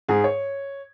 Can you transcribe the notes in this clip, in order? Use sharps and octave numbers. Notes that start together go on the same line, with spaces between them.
G#2 G#4
C#5